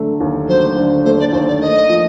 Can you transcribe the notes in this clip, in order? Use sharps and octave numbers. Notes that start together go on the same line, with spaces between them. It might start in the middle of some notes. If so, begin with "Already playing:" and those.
Already playing: D3 F#3 A3
D#2
F#3 C5
D3
A3 C5
D5
D#2 C5
D5
A#3 D#5
F3